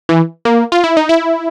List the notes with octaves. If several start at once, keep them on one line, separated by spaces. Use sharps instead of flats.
E3
A#3
F4
E4
D#4
E4